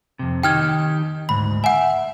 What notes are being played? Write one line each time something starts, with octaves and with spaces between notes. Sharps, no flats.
F2 C3
D#3 D#4 G4 G5 F6 G#6
D2 G#2 B5
E5 F#5 G#5